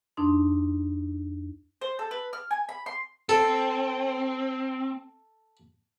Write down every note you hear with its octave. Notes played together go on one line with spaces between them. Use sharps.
F2 D4 D#4 C6
C5
A4
B4
F6
G#5
B5
C6
C4 A4